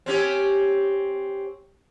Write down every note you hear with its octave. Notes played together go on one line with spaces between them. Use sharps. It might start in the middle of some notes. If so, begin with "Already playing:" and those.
C4 C#4 G4